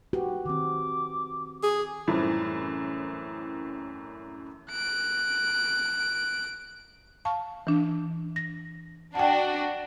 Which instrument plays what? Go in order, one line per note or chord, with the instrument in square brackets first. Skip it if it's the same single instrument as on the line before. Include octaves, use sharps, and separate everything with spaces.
[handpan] F#4 G4 B4
[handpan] D#3 C4 [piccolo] D6
[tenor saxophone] G#4
[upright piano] F#2 A2 E3 G3 A3 C4
[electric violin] F#6 D7
[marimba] F5 A5 C#6
E3 D4
A#6
[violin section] D4 F#4 [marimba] G5 A5